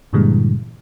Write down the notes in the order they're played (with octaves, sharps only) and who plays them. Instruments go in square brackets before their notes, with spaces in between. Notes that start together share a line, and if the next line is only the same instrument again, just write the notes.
[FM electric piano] G2 A#2 D3 E3 G3 G#3